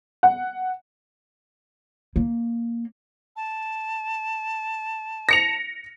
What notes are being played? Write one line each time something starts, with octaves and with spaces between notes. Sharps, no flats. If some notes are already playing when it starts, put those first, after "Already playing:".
F#5
A#3
A5
A#6 C#7 F7